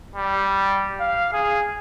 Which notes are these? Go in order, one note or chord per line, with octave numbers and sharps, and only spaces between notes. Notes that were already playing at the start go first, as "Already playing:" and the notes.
G3
F5
G#4